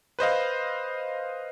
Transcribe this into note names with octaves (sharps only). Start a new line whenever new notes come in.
B4 C5 D#5 F5